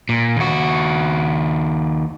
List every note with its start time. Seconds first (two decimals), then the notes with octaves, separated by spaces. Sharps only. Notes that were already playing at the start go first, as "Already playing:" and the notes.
0.09 A#2
0.37 D#2 F#4